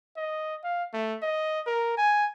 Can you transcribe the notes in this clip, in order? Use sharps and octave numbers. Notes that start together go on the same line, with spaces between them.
D#5
F5
A3
D#5
A#4
G#5